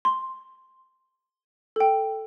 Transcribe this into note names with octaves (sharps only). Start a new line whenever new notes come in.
C6
A4 G5